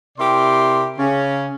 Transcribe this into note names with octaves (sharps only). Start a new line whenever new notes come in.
C3 E4 G4 A#4 D5 C6
C#3 C#4